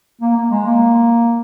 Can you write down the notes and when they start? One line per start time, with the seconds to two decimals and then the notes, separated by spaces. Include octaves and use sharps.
0.21 A#3
0.37 A#3
0.51 G#3
0.66 A#3